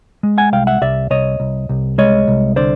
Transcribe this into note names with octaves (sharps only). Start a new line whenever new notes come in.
G#3
F#5 G#5
C2 F5 G5
E5 F#5
C2 D5 E5
C2 C#5 D#5
C2
C2
G#3 C#5 D#5
C2
D3 C5 D5